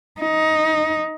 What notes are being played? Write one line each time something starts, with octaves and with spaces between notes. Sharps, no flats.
D#4